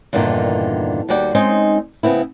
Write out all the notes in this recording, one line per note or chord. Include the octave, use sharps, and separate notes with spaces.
E2 G2 A#2 D3 D#3
D#2 G3 F#4 D5 G5
G#3 C4 C#4 D#4
C#3 B3 C4 E4